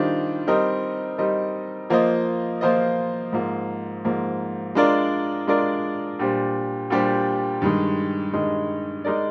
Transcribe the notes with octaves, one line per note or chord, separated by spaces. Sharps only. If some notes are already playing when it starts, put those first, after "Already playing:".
Already playing: D#3 G3 D4 F4 C5
G3 C4 D#4 A#4 D#5
G3 C4 D#4 A#4 D#5
F3 A#3 F4 C5 D#5
F3 A#3 F4 C5 D#5
G#2 F3 A#3
G#2 F3 A#3
G#3 D4 F4 A#4 D5
G#3 D4 F4 A#4 D5
A#2 G3 D4 G4 C5
A#2 G3 D4 G4 C5
G2 D#3 G#3
G2 D#3 G#3
G#3 D#4 A#4 D5